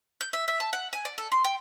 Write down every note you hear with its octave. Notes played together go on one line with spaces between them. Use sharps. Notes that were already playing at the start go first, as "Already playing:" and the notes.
G6
E5
E5
A5
F#5
G#5
D5
A4
C6
G5